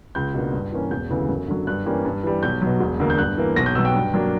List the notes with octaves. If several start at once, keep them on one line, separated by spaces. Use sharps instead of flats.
C#2 G6
B2 A#3 D4
G2
E3 A#3 C#4
E1 G6
D2 C#3 E3
F#2
D3 F#3
G2 F#6
E3 G3 A#3 C#4
G2
E3 G3
B1 G6
B2 F#3
E1
D2 D3 A#3
G6
G2 F#6
E3 A#3
B1 A#6
G6
B2 F#3 E6
G5
G2
F#3 A#3 D4